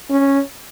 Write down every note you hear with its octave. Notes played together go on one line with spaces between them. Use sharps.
C#4